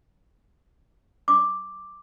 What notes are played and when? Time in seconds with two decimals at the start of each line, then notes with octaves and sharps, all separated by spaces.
1.28 D6